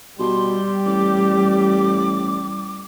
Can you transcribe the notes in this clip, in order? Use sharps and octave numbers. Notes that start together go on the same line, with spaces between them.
B2 G3 G4 C6
A1 D6